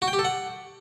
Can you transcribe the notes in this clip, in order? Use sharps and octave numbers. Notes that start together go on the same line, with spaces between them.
F#4
G5
G4
A4
F#5